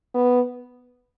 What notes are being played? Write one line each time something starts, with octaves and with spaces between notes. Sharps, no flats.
B3